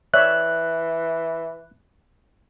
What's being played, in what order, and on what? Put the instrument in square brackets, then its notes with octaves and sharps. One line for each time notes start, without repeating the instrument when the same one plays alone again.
[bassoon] E3 [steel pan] C#5 D5 E5 [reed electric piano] F#6